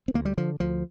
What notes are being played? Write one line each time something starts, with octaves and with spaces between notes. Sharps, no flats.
C4
D2 A#3
G3
D3 F3
D2 F3